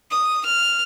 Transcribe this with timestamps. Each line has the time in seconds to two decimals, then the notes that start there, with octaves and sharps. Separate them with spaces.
0.11 D#6
0.46 F6